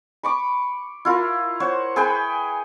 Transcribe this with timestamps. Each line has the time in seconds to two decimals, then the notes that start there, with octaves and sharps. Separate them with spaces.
0.23 B5 C#6 D6
1.05 E4 F4 A#4
1.60 C5 C#5 F#5
1.96 G#4 B4 G5 G#5